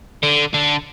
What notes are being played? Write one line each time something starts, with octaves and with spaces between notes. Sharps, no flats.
D3
D3